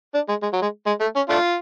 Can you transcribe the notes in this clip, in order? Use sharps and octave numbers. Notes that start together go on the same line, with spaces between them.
D4
G#3
G#3
F#3
G#3
G#3
A3
C#4
A3 D4 F4